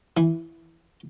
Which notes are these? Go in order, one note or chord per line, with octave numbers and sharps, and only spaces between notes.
E3